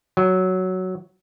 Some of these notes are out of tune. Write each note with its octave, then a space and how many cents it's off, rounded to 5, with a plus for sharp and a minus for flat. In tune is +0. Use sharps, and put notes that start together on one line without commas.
F#3 +5